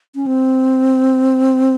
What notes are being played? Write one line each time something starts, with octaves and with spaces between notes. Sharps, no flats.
C#4
C4